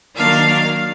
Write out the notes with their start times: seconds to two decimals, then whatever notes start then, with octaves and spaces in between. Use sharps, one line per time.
0.15 D#3 F#3 A#3 D4 F5